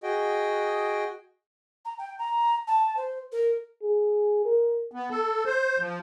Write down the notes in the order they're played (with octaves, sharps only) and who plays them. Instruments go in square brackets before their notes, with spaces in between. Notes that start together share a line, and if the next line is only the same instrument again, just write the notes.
[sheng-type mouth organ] F#4 G#4 D#5 G5
[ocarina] A#5
G5
A#5
A5
C5
A#4
[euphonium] G#4
A#4
[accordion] B3
A4
C5
F3